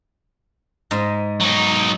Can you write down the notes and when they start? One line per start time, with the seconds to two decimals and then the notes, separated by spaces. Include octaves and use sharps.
0.91 G#2 G#3
1.40 F#3 D#4